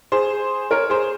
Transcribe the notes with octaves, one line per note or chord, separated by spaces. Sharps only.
G#4 C5
A#4 C#5
G#4 C5